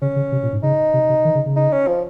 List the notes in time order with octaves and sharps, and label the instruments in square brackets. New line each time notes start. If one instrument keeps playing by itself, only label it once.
[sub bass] C#3 [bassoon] C#4
[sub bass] C#3
C3
A#2
G#2
[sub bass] C#3 [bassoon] D#4
[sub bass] C3
C3
D#3
C#3
C#3
[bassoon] D#4
C#4
F3